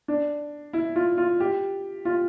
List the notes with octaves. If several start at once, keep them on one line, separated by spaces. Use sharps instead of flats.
D4
E4
F4
F4
G4
F4